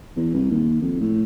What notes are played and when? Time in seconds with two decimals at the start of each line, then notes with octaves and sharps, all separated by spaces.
0.16 E2
0.34 C2
0.51 D#2
0.81 F2
1.00 A2